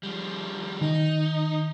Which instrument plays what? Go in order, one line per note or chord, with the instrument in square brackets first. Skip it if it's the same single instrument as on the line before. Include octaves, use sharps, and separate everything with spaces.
[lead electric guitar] F3 G3
[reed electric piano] D#3 [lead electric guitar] D#4